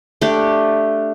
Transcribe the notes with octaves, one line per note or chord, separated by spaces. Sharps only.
A3 D4 G4